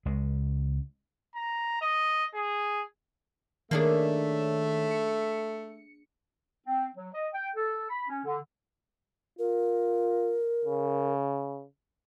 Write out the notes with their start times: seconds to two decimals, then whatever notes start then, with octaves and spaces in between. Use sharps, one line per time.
0.05 C#2 G#3
1.36 A#5
1.82 D#5
2.34 G#4
3.71 D#3 A3 A#3 D4 G#4 C#5 E5
4.91 C#7
6.67 C4
6.96 F#3
7.14 D#5
7.33 G5
7.55 A4
7.90 B5
8.09 C#4
8.24 D3
9.39 F4 A#4
10.65 C#3